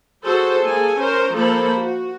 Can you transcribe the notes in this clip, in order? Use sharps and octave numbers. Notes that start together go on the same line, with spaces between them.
F#4 G#4 A4 C5
A#3 G#4 A4 G#5
C#4 A#4 C5
F3 A#3 A4 C5 B5
F#4